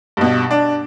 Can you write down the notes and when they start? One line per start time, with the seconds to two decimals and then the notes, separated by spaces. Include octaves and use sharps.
0.17 G2 B2
0.51 D4